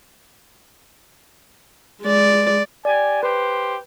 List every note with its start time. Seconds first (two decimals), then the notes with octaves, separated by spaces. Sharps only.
2.02 G#3 D5
2.85 G4 D5 G#5
3.23 G4 B4 C5